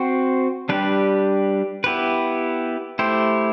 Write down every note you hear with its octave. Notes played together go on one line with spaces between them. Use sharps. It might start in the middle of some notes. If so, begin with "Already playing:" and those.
Already playing: C4 F#4 C5
G3 D4 G4 B4
B3 E4 G4 B4
A3 E4 G4 C5